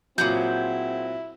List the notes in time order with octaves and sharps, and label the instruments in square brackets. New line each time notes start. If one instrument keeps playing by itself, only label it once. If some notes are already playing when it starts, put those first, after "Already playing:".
[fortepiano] A#2 F#3 [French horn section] C4 [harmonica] E4 [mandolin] G#4 F#5 G6